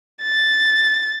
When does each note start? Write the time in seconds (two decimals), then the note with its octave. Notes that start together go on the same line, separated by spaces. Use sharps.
0.21 A6